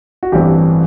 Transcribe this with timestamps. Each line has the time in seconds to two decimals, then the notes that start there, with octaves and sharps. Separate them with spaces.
0.23 F#4
0.32 A1 G2 E3 A3 C4 G4